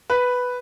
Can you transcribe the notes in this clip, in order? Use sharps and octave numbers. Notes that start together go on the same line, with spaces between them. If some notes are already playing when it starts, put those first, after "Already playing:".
B4